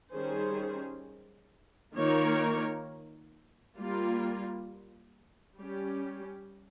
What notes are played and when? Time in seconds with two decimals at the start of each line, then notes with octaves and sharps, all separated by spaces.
0.13 D#3 G3 C#4 G#4 C5
1.95 D#3 A#3 F4 A#4 C#5
3.77 G3 A#3 F4
5.59 G3 C#4 G4